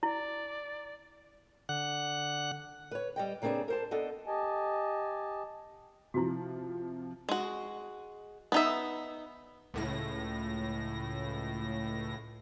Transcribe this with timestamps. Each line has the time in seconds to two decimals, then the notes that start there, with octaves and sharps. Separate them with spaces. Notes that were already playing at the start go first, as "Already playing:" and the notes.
0.03 E4 D5
1.69 D3 F#5 F#6
2.91 B4 C#5
3.16 G3 D#5 G5
3.42 C#3 A#3 C4 D4 G#4 B4
3.68 A#4 C5 A5
3.91 B3 D4 A4 D#5
4.27 G4 D#5 G#5 A5
6.14 C3 F3 E4 F#4
7.29 G#3 F#4
8.52 B3 D#4 E5
9.74 C#2 A2 A#6